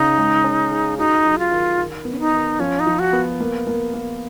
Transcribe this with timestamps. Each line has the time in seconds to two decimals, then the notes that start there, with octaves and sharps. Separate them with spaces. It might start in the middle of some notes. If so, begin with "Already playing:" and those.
Already playing: C#3 D#4
0.18 G#3
0.44 C#4
0.71 G#4
0.98 D#4 F#4
1.25 F#3
1.39 F4
1.51 D#3
1.78 D#3
2.05 B3
2.12 C#4
2.19 D#4
2.33 D#3
2.59 F3 C#4
2.80 D#4
2.87 F3
2.99 F#4
3.13 B3
3.40 A#3
3.67 A#3
3.94 A#3